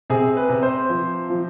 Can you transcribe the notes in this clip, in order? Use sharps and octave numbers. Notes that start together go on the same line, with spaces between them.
C3 G#4
B4
C3
C5
F3
F3